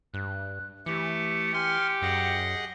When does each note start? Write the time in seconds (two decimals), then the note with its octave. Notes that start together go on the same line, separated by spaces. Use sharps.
0.14 G2 F#6
0.86 E3 A3 G4 C#7
1.54 G4 G#5 C6 F6
2.02 F#2 G#4 D#5 F#5